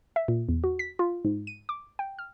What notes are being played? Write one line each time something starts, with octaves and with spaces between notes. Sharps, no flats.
E5
A#2
E2
F#4
B6
F4
G#2
D#7
D6
G5
F6